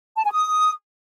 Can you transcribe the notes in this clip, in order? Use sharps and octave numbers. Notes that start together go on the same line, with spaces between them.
A5
G#5
D#6